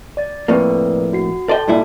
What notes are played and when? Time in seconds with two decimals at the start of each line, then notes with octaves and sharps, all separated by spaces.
0.17 D5 A6
0.48 F2 A2 A#3 A#4 B4 D5
1.13 F#4 C7
1.49 A4 D5 D#5 G5 A5 C6
1.68 G2 A#2 D#4 E4 F#4 D5